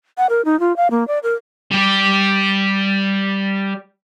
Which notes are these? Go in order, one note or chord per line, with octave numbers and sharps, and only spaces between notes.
F#5
A#4
D#4
F4
F5
A#3
D5
A#4
G3 G4